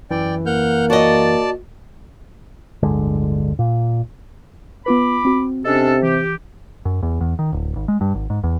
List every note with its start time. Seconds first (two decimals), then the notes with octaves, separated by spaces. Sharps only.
0.11 F#2 E3 D5 G5
0.46 A#3 F#5 F6 G6
0.90 F#4 D5 D#5 A5
2.83 D1 G1 D3 G#3
3.59 A#2
4.86 B3 F4 B4 B5 D6
5.25 C4 F#4
5.65 C3 C#4 D4 A4 D#5
6.03 E3 G4
6.85 F#2
7.03 E2
7.21 E2
7.39 D#3
7.53 D1
7.76 G#1
7.88 G#3
8.01 G2
8.15 G#1
8.30 G#2
8.44 E2